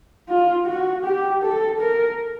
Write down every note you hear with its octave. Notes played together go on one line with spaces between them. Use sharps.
F4
F#4
G4
A4
A#4